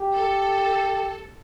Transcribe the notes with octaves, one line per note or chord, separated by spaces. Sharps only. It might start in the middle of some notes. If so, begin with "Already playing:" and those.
Already playing: G4
A4